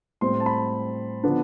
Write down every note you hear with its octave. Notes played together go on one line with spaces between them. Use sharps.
A2 G3 C4 C6
A5
B5
D3 F3 B3 D4